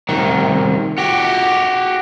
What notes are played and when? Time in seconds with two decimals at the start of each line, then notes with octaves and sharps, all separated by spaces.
0.09 C2 D#3
0.98 F#4 G4